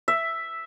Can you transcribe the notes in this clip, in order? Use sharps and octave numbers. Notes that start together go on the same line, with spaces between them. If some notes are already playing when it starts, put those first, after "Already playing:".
E5